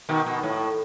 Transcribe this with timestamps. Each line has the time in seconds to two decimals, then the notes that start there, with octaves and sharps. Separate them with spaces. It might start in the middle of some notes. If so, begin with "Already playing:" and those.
0.09 B2 D#3
0.26 B2
0.43 A2